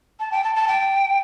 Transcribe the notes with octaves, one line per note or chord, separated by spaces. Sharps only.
A5
G5
A5
A5
G5